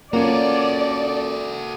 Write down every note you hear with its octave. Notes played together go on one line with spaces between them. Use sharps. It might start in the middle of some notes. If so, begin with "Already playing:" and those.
A#3 C#4 F4 F#4 A4 A#4 D5